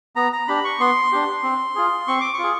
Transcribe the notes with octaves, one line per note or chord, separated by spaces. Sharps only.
B3 A#5
A#5
D4 G4 B5
C#6
B3 C6
D4 G4
C4
F4 G#4
C4 C#6
D6
C#6
F4 G#4